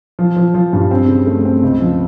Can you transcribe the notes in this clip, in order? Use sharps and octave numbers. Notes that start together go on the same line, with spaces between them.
F3
F3
F3
G2
C4
C#3
A3
C4
C#2
F3